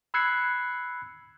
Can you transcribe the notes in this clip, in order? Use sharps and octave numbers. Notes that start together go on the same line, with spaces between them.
B5 E6 F#6 G#6 C7 C#7